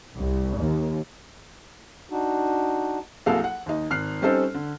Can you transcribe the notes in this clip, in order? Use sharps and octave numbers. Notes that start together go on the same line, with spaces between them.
C2
D#2
D4 D#4 F#4
C2 F#3 A#3 G#4 A4 F5
F#5
D#2 D#4
G#1 F6 F#6 C7
G3 C4 C#4 D#4 A4 C5
D3